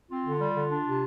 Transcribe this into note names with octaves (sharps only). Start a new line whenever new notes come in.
C4 F4
D3
G3
D3
D4
C3